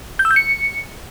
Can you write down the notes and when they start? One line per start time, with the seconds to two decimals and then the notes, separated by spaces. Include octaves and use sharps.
0.19 G6
0.25 E6
0.31 G6
0.36 C#7